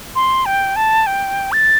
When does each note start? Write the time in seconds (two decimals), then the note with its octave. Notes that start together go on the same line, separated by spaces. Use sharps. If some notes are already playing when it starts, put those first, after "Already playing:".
0.16 C6
0.46 G5
0.76 A5
1.07 G5
1.52 A6